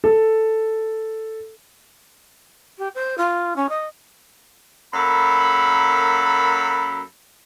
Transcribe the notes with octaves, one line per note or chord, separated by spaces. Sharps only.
A4
G4
C5
F4
C#4
D#5
F#2 A#3 A4 B5